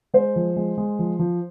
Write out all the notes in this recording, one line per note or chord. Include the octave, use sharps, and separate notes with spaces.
G#3 C5
F3
G#3
G#3
F3
F3